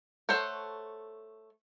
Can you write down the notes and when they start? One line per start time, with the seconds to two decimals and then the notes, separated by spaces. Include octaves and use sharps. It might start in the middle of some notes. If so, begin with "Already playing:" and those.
0.29 A3 A4 C5 C#5 F#5